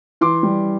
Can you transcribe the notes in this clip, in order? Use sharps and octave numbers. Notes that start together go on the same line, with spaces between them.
E3 C6 D6
G3